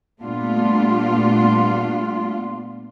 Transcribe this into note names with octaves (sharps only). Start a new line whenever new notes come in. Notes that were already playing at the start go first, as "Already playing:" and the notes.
A#2 G3 A3 B3 D4 F4